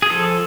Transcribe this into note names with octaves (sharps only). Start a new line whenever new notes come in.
G#4
F3 A4